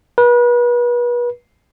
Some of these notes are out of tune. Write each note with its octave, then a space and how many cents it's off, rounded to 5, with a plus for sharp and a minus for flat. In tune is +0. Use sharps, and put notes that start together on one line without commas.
B4 -35